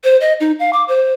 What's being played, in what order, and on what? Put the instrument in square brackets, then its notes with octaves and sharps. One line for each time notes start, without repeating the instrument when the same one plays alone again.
[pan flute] C5
D#5
D#4
F5
D6
C5